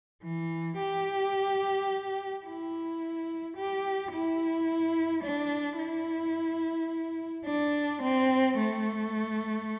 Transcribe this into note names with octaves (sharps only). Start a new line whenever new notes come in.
E3
G4
E4
G4
E4
D4
E4
D4
C4
A3